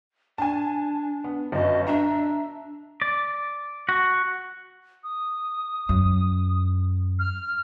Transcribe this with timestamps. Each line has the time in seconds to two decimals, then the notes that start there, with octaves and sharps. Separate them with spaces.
0.38 D4 G#5 A5
1.24 B3
1.52 G1 F#2 D#5
1.87 D4 E5 A#5
3.02 D5
3.89 F#4
5.04 D#6
5.89 F#2
7.19 F6